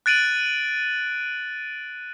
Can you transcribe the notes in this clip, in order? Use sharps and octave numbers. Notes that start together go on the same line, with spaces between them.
F#6 A6 D7 D#7 F#7